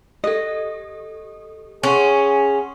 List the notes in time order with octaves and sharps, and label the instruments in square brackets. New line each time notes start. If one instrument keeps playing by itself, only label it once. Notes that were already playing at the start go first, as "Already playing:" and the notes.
[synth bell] G4 A4 [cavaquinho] D#5
[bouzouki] C#4 [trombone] G#4 [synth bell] F#5 C6 C#6